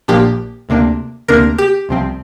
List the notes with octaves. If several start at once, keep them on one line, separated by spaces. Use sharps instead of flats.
A#1 A#2 F3 A#3 D4 G4
D2 C3 A#3 D4
D2 C3 A#3 D4 A#4
G4
C2 C3 F3 C4